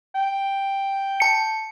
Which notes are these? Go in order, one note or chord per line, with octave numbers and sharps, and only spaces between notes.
G5
A5 C#7